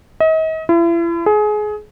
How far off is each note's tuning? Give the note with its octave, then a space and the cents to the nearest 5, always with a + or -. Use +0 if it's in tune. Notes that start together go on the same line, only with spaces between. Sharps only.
D#5 +40
E4 +40
G#4 +25